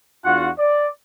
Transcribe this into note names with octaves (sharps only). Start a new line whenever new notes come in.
E2 D4 F4 F#4 F#5
D5